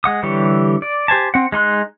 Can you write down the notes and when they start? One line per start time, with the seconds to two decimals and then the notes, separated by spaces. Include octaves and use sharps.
0.04 G#3 F#5 D#6
0.23 D3 E3 G3 G4 C#5
0.82 D5
1.08 G4 C5 G#5 A5
1.34 C4 F#5
1.52 G#3 D#4 C6 F#6